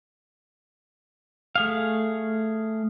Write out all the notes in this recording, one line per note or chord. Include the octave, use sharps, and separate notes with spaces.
A3 G#4 F5